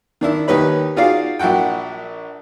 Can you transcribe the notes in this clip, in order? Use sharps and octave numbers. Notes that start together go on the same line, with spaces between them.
D#3 D4 E4
D#2 D#4 G4 B4 C#5 B5
D#4 F4 F#4 G#4 D5 F5
A#1 E4 F#4 F#5 G5